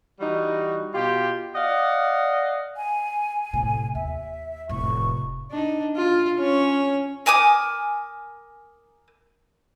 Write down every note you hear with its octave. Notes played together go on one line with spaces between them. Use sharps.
E3 G3 D#4 F#4
B2 F4 G4
D5 D#5 F5 F#5
G#5
A2 C3
D#2 E5
F1 A2 C#6
D4 D#4
F4
C#4 C#5
A#4 G#5 D6 D#6